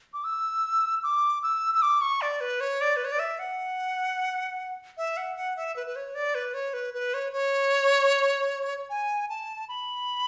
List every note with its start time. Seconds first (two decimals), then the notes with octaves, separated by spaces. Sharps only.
0.13 D6
0.24 E6
1.03 D6
1.43 E6
1.75 E6
1.82 D6
2.01 C#6
2.22 D5
2.41 B4
2.61 C#5
2.81 D5
2.96 B4
3.05 C#5
3.12 D5
3.19 E5
3.39 F#5
4.97 E5
5.17 F#5
5.36 F#5
5.57 E5
5.76 B4
5.87 B4
5.96 C#5
6.15 D5
6.35 B4
6.54 C#5
6.73 B4
6.94 B4
7.14 C#5
7.33 C#5
8.90 G#5
9.30 A5
9.69 B5